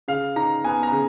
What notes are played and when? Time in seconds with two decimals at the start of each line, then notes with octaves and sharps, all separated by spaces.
0.08 C#3 F5
0.36 D#4 A#5
0.64 B3 G#5
0.83 A#5
0.92 C#3